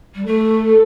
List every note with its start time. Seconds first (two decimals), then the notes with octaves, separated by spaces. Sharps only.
0.15 G3
0.25 A3 A4